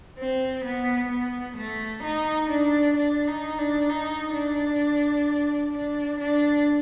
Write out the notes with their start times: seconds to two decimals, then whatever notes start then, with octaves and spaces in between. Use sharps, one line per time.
0.18 C4
0.65 B3
1.11 B3
1.57 A3
2.03 D#4
2.51 D4
2.97 D4
3.27 D#4
3.58 D4
3.89 D#4
4.35 D4
5.74 D4
6.20 D4